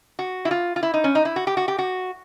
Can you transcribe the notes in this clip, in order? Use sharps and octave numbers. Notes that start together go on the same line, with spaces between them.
F#4
E4
F4
F4
E4
D#4
C#4
D#4
E4
F#4
G4
F#4
G4
F#4